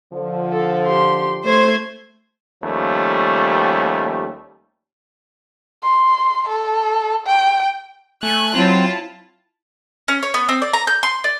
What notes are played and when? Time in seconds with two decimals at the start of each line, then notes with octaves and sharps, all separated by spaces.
0.12 D3 F3
0.53 A4
0.87 G4 C6
1.46 A3 C5 G#6
2.63 D#2 F3 G3 A3 C#4
5.83 C6
6.48 A4
7.27 G5
8.23 A3 G#5 F#6
8.55 F#3 C4 E4 F4 A5
10.08 C#4
10.23 C#5
10.34 B3
10.49 C4
10.62 D5
10.73 A#5
10.87 G6
11.03 C6
11.24 D5